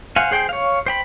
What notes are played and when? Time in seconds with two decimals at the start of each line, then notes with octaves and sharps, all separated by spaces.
0.16 C5 F5 F#5 G#5
0.31 G#4 C5 G5
0.49 C#5 F5
0.86 C5 G5 B5